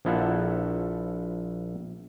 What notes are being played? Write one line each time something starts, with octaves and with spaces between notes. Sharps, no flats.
A#1 F3 E4 A4 F#5